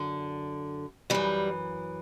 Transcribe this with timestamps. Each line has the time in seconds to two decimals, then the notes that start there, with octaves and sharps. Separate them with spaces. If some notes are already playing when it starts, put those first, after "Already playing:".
Already playing: F#2 D3
1.10 F#2 E3 G3